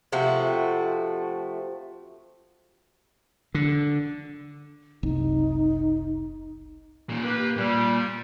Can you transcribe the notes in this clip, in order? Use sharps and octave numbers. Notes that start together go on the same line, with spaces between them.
C3 F3 A3 F#4
D3
F#1 C2 D#4
A#2 D#3
A#3 G4 B4
A#2 G3